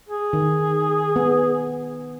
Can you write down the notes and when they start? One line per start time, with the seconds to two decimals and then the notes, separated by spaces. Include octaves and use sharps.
0.09 G#4
0.33 D#3
1.16 B3